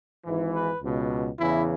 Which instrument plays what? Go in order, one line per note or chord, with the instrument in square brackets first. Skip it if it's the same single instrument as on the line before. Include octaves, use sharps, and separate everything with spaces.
[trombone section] G#1 G#2 E3
B4
C#2 B2
E2 C#3 E3 E4